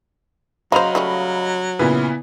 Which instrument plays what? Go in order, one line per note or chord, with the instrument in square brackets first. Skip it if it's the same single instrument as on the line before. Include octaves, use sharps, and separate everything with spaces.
[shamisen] C#3 C5 [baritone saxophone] F#3 [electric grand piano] D#5 F5 A#5 [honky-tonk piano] B5 F7
[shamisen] C#3 G3 A3
[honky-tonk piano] A#2 C#3 [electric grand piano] B3 E4 B4